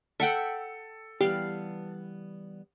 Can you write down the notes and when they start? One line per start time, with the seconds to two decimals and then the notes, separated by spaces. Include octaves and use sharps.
0.20 A4 E5 F#5 G5
1.21 E3 G3 B3 G4 F5